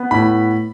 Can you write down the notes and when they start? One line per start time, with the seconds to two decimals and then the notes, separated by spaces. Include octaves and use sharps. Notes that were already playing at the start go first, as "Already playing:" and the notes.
Already playing: B3
0.11 A2 B5